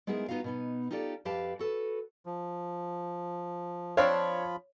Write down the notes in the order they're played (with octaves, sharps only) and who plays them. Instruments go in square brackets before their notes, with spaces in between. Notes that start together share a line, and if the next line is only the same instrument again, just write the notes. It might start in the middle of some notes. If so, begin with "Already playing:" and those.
[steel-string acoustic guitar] G#3 B3 D#4 E4 G#4 A#4
B3 D#4 F4 F#4 F5
B2 B3 D#4
D#4 F4 G4 A4 C#5 D5
F2 G4 B4 F5 A5
F#4 A4 B4
[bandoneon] F3
[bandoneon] F3 F4 B5 [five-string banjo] C4 D4 F5 [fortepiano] C#5